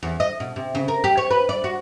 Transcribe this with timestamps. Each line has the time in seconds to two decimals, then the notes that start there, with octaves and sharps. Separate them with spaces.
0.03 E2
0.20 D#5
0.40 B2
0.56 C3
0.75 C#3
0.88 A#4
1.04 G4
1.17 C#5
1.31 B4
1.49 D5
1.64 F#4